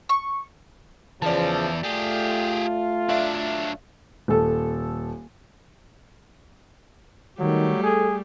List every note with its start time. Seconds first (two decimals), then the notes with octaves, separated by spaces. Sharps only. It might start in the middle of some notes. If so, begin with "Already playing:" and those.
0.09 C#6
1.22 E2 C#3 E3 F3 D5 A5
1.83 A3 F4 G4 G#4
3.09 F#3 D4 E5 F5
4.28 D#1 A4
7.39 D#3 F#3 G3 A3
7.84 G#4 A4